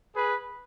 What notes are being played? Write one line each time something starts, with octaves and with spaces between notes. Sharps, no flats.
G#4 B4